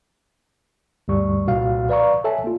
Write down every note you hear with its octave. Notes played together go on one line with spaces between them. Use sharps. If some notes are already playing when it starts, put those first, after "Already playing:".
D2 G2 G3 C#6
C2 A#2 F#4 F5 F6
B4 D5 F5 A#5 C#6
A4 C#5 E5 G#5 A5
A#3 F4